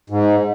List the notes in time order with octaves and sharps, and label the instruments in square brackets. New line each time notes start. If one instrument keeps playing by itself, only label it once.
[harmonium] G#2